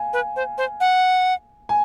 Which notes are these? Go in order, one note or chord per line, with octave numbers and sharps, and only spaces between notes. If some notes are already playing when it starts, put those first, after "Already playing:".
Already playing: F5 G#5
B4
C5
C5
F#5
G#5